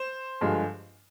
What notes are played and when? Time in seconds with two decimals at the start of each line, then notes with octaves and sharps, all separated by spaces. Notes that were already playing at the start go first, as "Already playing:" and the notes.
Already playing: C5
0.41 G2 D3 F3 G#3